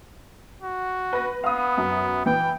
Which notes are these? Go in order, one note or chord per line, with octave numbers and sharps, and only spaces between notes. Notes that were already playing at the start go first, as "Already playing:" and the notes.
F#4
B4 A#6
B3 F5 B5 D#6
F#2
E3 G5